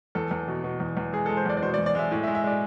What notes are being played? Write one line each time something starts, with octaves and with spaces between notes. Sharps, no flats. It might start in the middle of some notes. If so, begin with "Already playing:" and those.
E2 A4
E2
B2
B2
E2
E2
G#3 G#4
G#3 A4
C5
E2 D5
D5
B2 C5
D5
E2
D5
G#3 E5
A2
E5
G#3
E5
G#3 D5